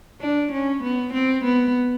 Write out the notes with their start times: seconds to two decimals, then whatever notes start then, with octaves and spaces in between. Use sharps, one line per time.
0.21 D4
0.52 C#4
0.83 B3
1.13 C4
1.45 B3